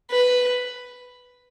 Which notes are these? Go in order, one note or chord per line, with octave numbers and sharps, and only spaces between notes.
B4